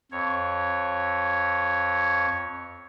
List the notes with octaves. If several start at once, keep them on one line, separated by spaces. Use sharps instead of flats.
F2 C#5